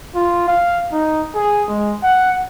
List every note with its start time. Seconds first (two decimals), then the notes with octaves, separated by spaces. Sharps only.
0.15 F4
0.48 F5
0.92 D#4
1.35 G#4
1.68 G#3
2.03 F#5